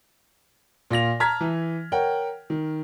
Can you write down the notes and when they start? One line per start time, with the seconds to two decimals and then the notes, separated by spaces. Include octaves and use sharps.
0.91 A#2 F4 A#6 F7
1.20 A5 A#5 F6 G#6 B6
1.40 E3
1.92 A#4 C#5 F#5 G5
2.50 D#3